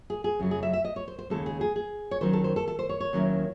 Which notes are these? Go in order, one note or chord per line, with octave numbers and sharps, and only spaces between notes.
G#4
G#4
F#2 C#3 F#3
G#4
E5
E5
D#5
C#5
C5
C5
D#2 C#3 G#3 A4
G#4
G#4
G#4
C#5
D#3 F#3 C#4 C5
A4
C5
A4
A4
C5
C#5
C#5
D#2 D#3 F#3 C#4 E4